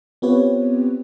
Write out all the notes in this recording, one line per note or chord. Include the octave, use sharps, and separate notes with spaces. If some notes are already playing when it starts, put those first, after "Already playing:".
B3 C4 F4 G4 B4 C#5